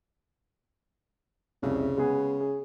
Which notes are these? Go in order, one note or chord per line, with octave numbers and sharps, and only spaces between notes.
C2 F2 C#3
G#3 B3 G#4
G#4